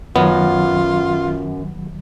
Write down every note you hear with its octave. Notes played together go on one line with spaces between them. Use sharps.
F#2 D#3 F#3 B3 F4